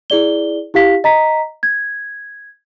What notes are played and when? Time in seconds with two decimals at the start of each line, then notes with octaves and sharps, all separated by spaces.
0.10 E4 G#4 D5 G7
0.74 E4 G4 F5 B6
1.04 D#5 A#5 B6
1.63 G#6